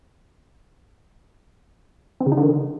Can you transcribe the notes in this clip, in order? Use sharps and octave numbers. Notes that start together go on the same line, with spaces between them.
C4
C#3
D#4
D3
D#3